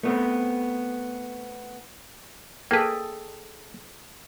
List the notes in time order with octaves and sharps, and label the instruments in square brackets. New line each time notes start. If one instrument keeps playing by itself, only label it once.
[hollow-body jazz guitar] A3 B3 C4
[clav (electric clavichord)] A#3 B4 [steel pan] G#4 A4 G5